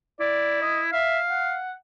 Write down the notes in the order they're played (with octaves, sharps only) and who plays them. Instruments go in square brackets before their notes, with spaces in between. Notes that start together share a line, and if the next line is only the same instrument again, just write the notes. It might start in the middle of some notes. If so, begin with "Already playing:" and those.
[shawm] E4 [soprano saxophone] D5
[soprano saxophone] D#5
[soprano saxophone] E5 [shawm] F5
[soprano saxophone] F#5